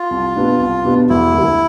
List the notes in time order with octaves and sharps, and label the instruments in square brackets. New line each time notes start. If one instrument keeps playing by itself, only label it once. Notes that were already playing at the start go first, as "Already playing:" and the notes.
Already playing: [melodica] F4
[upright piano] C2
B2 B3 D4 G4
C2
B2 B3 D4 G4
[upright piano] E1 [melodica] E4
[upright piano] D2 D3